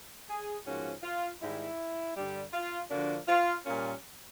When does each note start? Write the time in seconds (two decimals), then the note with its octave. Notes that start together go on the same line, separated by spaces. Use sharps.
0.29 G#4
0.65 G#2 F3 A#3 C#4 F#4
1.03 F4
1.41 G#2 D#3 G3 E4
2.16 G2 D3 G3
2.53 F4
2.90 D3 F3 A#3 D4 F#4
3.28 F4
3.65 A#2 G3 A#3 C#4 F4